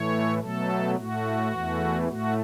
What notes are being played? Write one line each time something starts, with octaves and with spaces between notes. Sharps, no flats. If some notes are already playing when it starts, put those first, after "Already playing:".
Already playing: A2 E3 A3 C#5
B2 F#3 A3 A4
A2 A3 F#4
E2 E3 A3
A2 A3 F#4